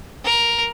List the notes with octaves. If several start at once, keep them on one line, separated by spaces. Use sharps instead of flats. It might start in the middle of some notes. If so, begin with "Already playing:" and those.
A#4